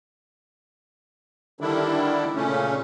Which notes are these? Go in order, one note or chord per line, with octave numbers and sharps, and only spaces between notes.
D3 D#3 G3 D4 E4
A#2 C#3 A3 C#4